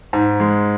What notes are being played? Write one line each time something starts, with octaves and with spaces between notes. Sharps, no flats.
G#2
G#3